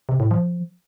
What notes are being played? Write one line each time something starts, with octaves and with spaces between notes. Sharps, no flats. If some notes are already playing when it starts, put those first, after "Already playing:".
C3
A2
F3